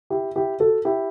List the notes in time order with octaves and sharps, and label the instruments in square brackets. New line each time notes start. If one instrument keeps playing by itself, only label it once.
[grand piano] E4 G4
E4 G4
F#4 A4
E4 G4